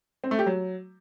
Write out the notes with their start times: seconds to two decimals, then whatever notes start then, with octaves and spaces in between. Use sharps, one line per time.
0.24 C4
0.31 A3
0.39 G4
0.46 F#3